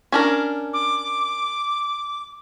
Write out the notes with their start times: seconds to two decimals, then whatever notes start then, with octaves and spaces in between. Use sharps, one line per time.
0.12 C#4 D4 A#4
0.73 D6